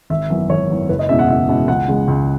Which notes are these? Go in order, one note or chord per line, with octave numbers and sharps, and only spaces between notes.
G#1 E5
F#2 E3 B3
G#1 C#5
F#2 E3 B3
F#1 B4
D#5
E2 B2 G#3 C#4 E5
F#5
F#1 E5
E2 B2 G#3 C#4
C#2 F#5
C#3 G#3
C#2